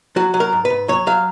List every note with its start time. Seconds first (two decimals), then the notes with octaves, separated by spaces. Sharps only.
0.16 F#3 F#4
0.34 F#3
0.40 A#4
0.52 G#2
0.65 B4
0.70 G#2
0.88 F#3 C#5
1.07 F#3 F5